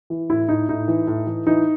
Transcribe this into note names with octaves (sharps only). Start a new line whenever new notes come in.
E3
A2 E4
A2 D#4
A2 D#4
E3
A2
E3
E3 D#4